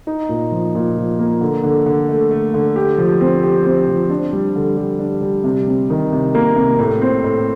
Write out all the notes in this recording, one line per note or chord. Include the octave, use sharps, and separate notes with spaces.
D#4
A#2
F3
A#2
F3
A#3
D3
D3
D3
A3
A3
D3
G4
F3
C4
G4
C4
F3
D4
G3
D3
G3
D4
G3
C3
C3
D#3
C3
A#3
C3
A2
C4
A2